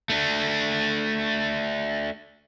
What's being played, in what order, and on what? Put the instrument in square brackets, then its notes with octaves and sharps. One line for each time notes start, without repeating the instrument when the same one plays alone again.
[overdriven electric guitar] A3 D4